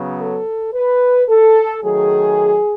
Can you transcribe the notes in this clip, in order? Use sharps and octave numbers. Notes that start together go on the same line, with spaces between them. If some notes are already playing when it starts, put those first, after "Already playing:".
Already playing: C#3 F#3 B3
A4
B4
A4
D#3 F#3 A3 G#4